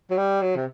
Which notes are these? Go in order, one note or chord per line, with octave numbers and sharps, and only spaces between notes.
F#3
G3
F#3
C3